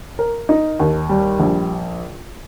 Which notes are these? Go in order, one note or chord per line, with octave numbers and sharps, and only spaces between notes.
A#4
D#4
D#2
G3
A#1